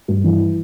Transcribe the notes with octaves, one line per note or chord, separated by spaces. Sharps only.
G2
E3